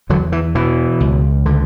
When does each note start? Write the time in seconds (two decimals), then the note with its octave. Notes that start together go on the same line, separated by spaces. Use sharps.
0.10 E2 D3 F#3
0.32 E3
0.55 B2 E3
1.00 C#2
1.46 D3